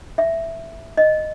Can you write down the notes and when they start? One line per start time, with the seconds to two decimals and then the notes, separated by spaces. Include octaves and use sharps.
0.18 E5
0.97 D#5